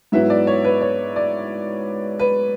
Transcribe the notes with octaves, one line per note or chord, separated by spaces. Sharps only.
G#2 F#3 B3 E4 E5
D5
C#5
B4
C#5
D5
B4